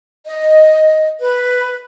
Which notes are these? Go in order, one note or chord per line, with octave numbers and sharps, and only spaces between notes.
D#5
B4